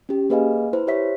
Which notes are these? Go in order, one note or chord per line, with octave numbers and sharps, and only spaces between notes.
C#4 G4
A#3 G#4 B4 D#5 F5 G#5
E4 B4 C5
G4 C5 C#5 E5 B6